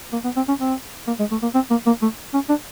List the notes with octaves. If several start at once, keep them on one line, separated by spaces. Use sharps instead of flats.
A#3
B3
C4
C#4
C4
A#3
G#3
A3
A#3
C4
A#3
A#3
A3
C#4
D4